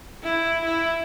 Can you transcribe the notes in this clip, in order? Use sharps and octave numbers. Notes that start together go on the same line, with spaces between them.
E4
E4